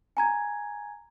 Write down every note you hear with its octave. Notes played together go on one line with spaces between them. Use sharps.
G#5 A#5 G#6